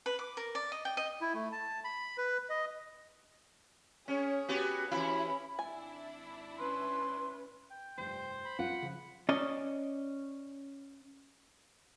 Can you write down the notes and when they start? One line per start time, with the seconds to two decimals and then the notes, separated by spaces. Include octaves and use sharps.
0.06 B4
0.19 D6
0.37 A#4
0.55 D5
0.72 D#5
0.85 G5
0.97 D#5
1.21 E4
1.34 A3
1.52 A5
1.84 B5
2.18 B4
2.50 D#5
4.08 C#4 G#4 C#5
4.49 B3 F#4 G4
4.91 E3 C#4 E4 B5
5.59 G#1 D4 E4 G#5
6.58 C#4 B4 C6
7.70 G5
7.98 F1 G2 C5
8.45 B5
8.59 A#1 F#2 C4 F4 F#5
8.82 C#3 F3
9.29 C#4 D5 D#5